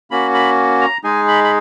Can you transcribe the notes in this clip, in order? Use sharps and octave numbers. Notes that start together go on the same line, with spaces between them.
A#3 C#4 F#4 B5
B5
A#5
G#3 D#4 G#4 G#5
B5
B5